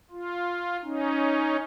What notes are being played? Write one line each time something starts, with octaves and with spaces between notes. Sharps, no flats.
F4
C#4 D#4